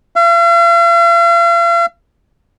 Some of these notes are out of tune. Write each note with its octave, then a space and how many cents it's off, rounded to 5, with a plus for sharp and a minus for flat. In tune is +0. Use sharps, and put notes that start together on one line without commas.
F5 -45